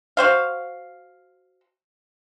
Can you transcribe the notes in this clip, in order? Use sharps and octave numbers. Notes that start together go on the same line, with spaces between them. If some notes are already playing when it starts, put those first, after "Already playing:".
F#4 C5 F5